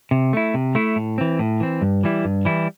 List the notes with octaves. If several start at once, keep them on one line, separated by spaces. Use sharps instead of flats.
C3
A3 E4
C3
A3 E4
A2
E3 C4
A2
E3 C4
G2
E3 G3 E4
G2
E3 G3 E4